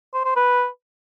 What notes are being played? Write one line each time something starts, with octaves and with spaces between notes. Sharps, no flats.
C5
C5
B4